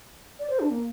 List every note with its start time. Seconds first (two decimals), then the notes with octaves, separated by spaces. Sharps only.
0.39 D5
0.50 C5
0.60 D4
0.71 A#3